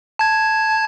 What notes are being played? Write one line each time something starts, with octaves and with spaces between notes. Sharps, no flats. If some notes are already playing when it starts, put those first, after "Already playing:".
A5 G#6